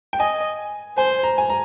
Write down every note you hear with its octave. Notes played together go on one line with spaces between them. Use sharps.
G5
D#5 G#5
C5 G#5
A#5
G#5
A#5